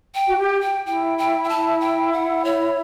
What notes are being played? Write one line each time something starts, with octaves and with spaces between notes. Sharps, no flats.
G5
F#4
G4
G5
E4 G5
G5
G5
A5
G5
F#5
C#5